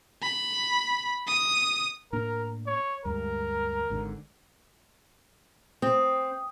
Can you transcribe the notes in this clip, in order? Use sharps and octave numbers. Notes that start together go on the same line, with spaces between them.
B5
D#6
A2 A#3 D4 A#4
C#5
D2 G2 G#3 A#4
G#1 G#2 D3
C4 D#6